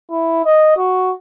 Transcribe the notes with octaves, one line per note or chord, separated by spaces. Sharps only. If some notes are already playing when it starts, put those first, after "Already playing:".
E4
D#5
F#4